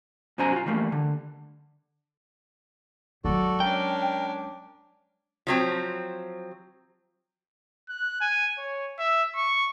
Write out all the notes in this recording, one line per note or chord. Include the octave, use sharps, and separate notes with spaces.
F#2 B2 C#4 C5 G#5 A#5
F4 F#4
E3 G3 A3 A#3
D3
F#3 G#3 F#4 A4 D5
C#4 D4 A#4 G5
F3 F#3 C4
F#6
G#5
C#5
E5
C#6